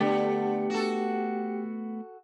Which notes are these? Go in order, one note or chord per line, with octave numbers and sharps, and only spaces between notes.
D3 A3 B3 G4
F#4 A4